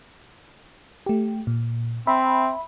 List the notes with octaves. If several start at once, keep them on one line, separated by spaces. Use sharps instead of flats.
A3 G4
A#2
C4 E5 B5